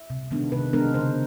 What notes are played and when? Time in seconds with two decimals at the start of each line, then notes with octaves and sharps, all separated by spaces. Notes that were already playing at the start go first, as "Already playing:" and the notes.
Already playing: E5
0.10 C3
0.31 D#3 G#3 B3 D4
0.52 C3 B4
0.73 D#3 G#3 B3 D4 A#4
0.94 C#3 C5